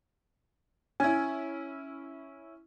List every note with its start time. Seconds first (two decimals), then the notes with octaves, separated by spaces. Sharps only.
1.00 C#4 E4 G#5